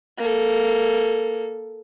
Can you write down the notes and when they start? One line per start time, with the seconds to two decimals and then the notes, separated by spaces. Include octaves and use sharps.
0.18 A#3 A4